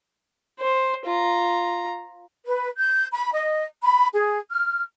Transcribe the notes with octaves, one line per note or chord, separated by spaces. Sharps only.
C5
F4 A#5
B4
G6
B5
D#5
B5
G#4
F6